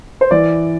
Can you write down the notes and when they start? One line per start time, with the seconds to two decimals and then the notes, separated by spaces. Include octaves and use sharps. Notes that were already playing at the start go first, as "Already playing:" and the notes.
0.21 C5
0.31 E3 D5